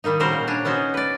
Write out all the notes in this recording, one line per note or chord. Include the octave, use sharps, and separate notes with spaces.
D#3 G3 A#3 D#4
A#2 C#3 G3 F#4 A#4 C5
A#2
D4 C#5 G#5
B3 C#4 D#4 F#4 C5
B4 D5